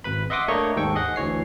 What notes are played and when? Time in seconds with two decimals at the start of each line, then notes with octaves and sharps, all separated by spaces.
0.04 G#1 B4 B5
0.30 D#5 E5 F#5 C6 D6 D#6
0.48 A3 A#3 D4 C#5 D#5 C#6
0.76 D#2 G#2 A4 G5 C#6
0.95 G#4 D#5 F#5
1.16 D2 E3 C#5 C7